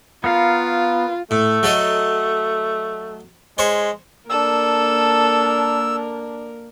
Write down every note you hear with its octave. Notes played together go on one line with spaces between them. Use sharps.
B3 F4 A#4 F5
A2 A3
F#3 A4 D#5
G#3 C5 C#5
A#3 D4 A4 A#4 E6